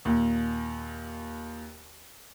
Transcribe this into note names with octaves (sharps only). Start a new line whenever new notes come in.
D#2 A#2